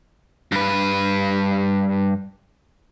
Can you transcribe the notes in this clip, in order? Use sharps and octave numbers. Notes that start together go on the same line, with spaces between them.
G2 B4